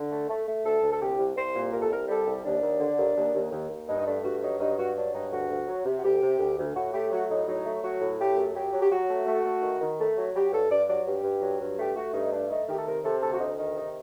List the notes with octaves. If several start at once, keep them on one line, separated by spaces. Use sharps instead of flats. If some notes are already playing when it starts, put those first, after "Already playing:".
Already playing: D3
A3
A3
A3
D2 A4
D2
A4
C2 G4
C2
C2 C5
A#2
C2 A#4
A4
C2 A#4
G3 A4
C2
D#2 D4
D#2
D3
D#2
D#2
D#2
D#2
D#2
G2 D#4
D#4
A3 D4
G2 F#4
F#3 D#4
G2 D#4
G2 F#4
F#3 D4
G2 D#4
D2 F#4
D2
F#3
C3
F#4
D2 G4
C3
D2
D2
A2 F#4
A3 G4
F#3 F#4
A2 D#4
F#3 D#4
A3
F#3 F#4
A2
A3 G4
F#2
F#3 G4
F#3
G4
F#3 F#4
A3
A3
A3
D#3
D#3
A3
F#3
F#3 G4
G2 A4
G2 D5
F#3 D5
G2 G4
G2
F#3
G2
A3 G4
A3 F#4
G2 D#4
A3 D4
A3 D#4
D#3 G4
A4
C3 A#4
C3 A4
D2 A4
F#4
D2 D#4
D#3 D#4
C3 D#4